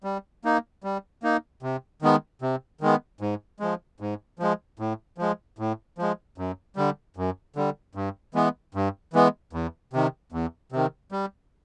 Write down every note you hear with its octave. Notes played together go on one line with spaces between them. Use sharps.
G3
A#3 D#4
G3
A#3 D#4
C3
D#3 G#3 B3
C3
D#3 G#3 B3
G#2
F3 G#3
G#2
F3 G#3
A2
F3 G#3
A2
F3 G#3
F#2
D3 G3
F#2
D3 G3
G2
E3 G#3 B3
G2
E3 G#3 B3
E2
C3 D#3
E2
C3 D#3
G3